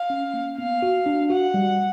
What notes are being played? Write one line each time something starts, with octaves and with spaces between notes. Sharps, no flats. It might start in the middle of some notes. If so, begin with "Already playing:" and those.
Already playing: F5
C#4
A#3
B3 F5
F#4
D4
F#4 F#5
G3